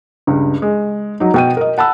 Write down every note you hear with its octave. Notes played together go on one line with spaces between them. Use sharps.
C#2 G2
G#3
F#3 D#4
B2 G5 D#7
A#4 D#5
F#5 A5 B5 E6